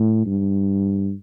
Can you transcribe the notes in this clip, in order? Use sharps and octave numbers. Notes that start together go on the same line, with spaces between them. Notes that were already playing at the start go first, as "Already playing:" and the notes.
Already playing: A2
G2